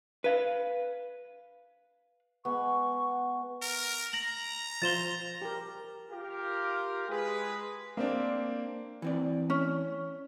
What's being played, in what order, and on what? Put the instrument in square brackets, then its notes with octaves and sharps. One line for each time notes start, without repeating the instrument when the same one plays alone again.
[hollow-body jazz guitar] B4 F5
[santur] G#3 B3 [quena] C#6
[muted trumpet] A#4
[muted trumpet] A#5 [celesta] A#6 F#7
[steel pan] F3 F4 C5 [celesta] A6 E7 G7
[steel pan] G4 A#4
[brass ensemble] F4 G4 A#4
G#3 G#4 B4
[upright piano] A#3 C4 D4
[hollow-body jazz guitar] E3 C4 D5
[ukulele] C#4